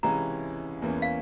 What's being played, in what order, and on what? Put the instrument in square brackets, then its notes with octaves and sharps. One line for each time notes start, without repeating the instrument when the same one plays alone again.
[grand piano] C#2 C3 E3 G#3 C#4 [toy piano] A#5
[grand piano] E2 E3 A#3 C#4
[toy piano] F5